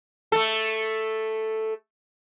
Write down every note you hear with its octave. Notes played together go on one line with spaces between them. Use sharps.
A3 A4